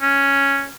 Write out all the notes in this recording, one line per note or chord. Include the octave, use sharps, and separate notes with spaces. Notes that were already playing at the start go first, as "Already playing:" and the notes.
C#4